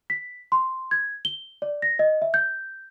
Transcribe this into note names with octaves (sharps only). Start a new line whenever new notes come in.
B6
C6
G#6
G7
D5
A#6
D#5
E5
G6